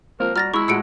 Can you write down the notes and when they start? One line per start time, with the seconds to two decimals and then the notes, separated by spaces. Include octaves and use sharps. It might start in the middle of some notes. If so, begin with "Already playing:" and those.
0.20 F3 A#3 C4 A#4
0.36 G3 F#4 A#5 F6 A6 A#6
0.54 G#3 E4 C#6 E6
0.68 A2 G#3 F#4 E6 C#7 D7